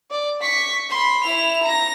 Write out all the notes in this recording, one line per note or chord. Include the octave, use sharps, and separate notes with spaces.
D5
C#6 B6
B5 C6
E4 F7
A#5 A#6